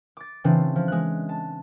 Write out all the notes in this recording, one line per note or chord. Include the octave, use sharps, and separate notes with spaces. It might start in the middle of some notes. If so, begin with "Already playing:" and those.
D6 A6
C#3 E3 C4 D4
F3
G#3 F#6
A5